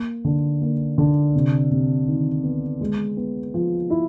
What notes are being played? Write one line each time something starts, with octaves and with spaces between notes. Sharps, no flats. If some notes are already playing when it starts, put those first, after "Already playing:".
Already playing: A#3
D3
A#3
D3
C3
C3
D#3
B3
G#3
B3
F3
E4